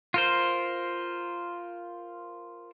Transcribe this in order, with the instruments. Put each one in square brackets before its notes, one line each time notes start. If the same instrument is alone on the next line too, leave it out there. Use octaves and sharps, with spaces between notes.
[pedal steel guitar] F4 A#4 C5